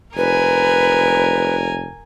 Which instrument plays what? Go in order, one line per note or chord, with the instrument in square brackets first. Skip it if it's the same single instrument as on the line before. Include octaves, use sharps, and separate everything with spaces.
[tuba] F1 [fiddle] A#4 G#5 [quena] B4